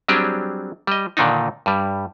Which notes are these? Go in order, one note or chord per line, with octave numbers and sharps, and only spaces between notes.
F#3 G3 C4 D4 G4 G#4
G3 D#5
A#2 D3 D#3 D4 D#4
G2 G3